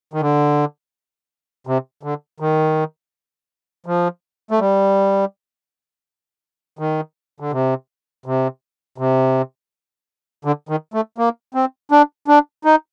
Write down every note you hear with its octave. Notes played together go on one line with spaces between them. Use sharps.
D#3
D3
C3
D3
D#3
F3
A3
G3
D#3
D3
C3
C3
C3
D3
D#3
A3
A#3
C4
D4
D4
D#4